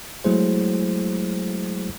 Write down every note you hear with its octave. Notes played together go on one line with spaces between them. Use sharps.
F#3 G#3 A3 E4 G#4 C5